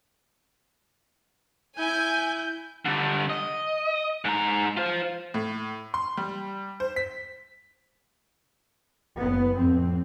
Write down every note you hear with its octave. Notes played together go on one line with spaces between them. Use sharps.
E4 G#5 G6
D3 G3
D#5
G#2 A#5
F4 C5
A2
C6
G3
C5
B6
F#1 B3
F2 A2 C4